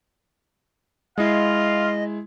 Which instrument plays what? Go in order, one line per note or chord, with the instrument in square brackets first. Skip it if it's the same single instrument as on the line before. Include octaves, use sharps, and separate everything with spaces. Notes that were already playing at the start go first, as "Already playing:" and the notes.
[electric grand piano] G#3 E4 [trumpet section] F4 F5 [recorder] D#5